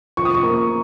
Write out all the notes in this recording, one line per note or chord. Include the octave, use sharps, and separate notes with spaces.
F3 C#6
D#6
C#6
A#3